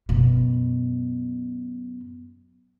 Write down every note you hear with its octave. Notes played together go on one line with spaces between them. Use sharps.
F#2 B2